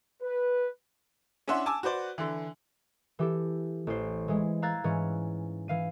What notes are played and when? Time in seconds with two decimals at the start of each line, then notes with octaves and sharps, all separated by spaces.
0.22 B4
1.48 C#4 D4 E4 E5 F#5 C6
1.66 G#5 A5 D6 E6
1.83 F#4 B4 C5 D5
2.18 D3 E3
3.19 E3 G4 A4
3.87 A1 C5
4.28 E3 G#3
4.62 F5 A#5 E6 F#6 G#6 A6
4.84 G#2 E3 C#4
5.68 E3 F5 D#7